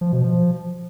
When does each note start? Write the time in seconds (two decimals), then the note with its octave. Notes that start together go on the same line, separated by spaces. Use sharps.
0.01 F3
0.12 B2
0.24 F3